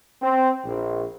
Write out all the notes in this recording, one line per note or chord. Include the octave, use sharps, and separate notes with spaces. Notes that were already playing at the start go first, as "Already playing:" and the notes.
C4
A#1